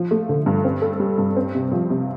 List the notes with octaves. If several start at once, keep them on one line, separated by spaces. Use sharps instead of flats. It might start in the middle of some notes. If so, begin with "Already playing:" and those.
Already playing: F3
A3
D3
G2
C4
A4
G3
G2
C4
C3
F3
C3